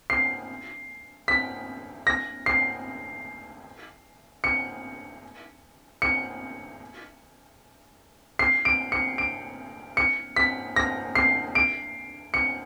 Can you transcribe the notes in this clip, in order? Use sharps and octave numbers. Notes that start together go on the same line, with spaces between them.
C7
B6
A#6
C7
C#7
C#7
C7
D7
C#7
D7
C#7
B6
A#6
C7
D7
C#7